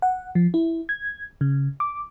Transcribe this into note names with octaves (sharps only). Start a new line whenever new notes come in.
F#5
F3
E4
G#6
C#3
D6